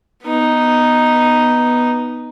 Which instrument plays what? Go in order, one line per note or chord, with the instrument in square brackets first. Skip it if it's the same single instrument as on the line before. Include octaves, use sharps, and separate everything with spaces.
[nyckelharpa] B3 D#4